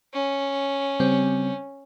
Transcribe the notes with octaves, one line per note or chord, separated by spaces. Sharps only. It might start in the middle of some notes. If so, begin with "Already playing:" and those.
C#4
C#3 G3 C4